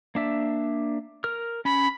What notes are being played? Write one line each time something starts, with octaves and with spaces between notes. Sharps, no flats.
A#3 D4 E5
A#4 F6
C#4 B5